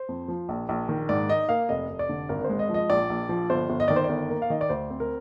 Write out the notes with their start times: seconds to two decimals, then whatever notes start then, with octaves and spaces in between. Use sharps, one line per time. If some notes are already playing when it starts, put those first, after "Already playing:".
Already playing: C5
0.09 F2
0.28 F3
0.49 A#1
0.69 A#1
0.89 D#3
1.09 G#2 D5
1.29 D#4 D#5
1.49 A#3 F5
1.69 F1 D#5
1.90 F1
1.99 D5
2.09 D3
2.29 G#1 A#4
2.44 G#3 C5
2.59 D#5
2.69 F3
2.74 D#5
2.90 A#1 D5
3.10 A#1
3.29 F3
3.50 G1 C5
3.70 G1
3.80 D#5
3.88 D#3 D5
3.96 C5
4.04 D5
4.09 G1
4.30 A#3
4.42 F5
4.50 D#3 D#5
4.61 D5
4.70 D2 C5
4.90 C4
5.00 A#4